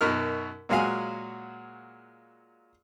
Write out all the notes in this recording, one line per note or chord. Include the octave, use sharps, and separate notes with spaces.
F#2 B2 D#4 A#4 F6
A#2 F#3 G#3 F#4 F5 G#5